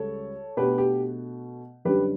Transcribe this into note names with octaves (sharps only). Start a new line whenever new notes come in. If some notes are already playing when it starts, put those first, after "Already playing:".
Already playing: C#2 C#3 G3 A4 C#5
B2 A3 D4 G4 B4
G4
F#2 D3 G3 D4 G4 B4